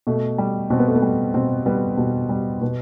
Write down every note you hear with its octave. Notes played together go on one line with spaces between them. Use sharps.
B2 A3
G3
B2 C4
B3
A3
B3
G3
B2 C4
G3 B3
B2
G3
B2 B3